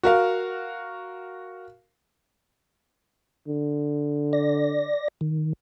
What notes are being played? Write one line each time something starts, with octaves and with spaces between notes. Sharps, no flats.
F#4 A#4 F5
D3
D5 A#6
D#3